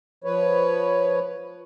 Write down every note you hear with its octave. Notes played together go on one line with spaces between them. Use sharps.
F3 B4 C#5